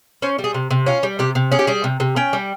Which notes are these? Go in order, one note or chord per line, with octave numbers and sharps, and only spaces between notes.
C#4 C5
G3
G#4
C3
C3
C#4 F4
G3
C3 G4
C3
C#4 G#4
G4
G3 G#4
C3
C3
C#4 G5
G3